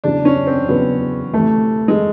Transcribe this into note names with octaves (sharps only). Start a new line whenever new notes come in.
E2 C#3 F#3 D4
C#4
C4
E2 C#3 F#3 B3
D2 C3 E3 A3
G#3